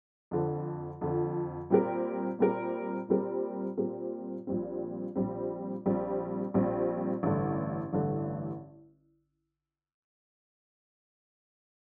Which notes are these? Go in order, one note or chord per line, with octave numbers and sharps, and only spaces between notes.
F2 D3 F3
F2 D3 F3
A#2 G3 C4 G4 A#4
A#2 G3 C4 G4 A#4
A#2 G3 C4 G4 A#4
A#2 G3 C4 G4 A#4
A#1 A#2 G3 C4
A#1 A#2 G3 C4
A#1 A#2 G3 C4
A#1 A#2 G3 C4
A1 G2 D3
A1 G2 D3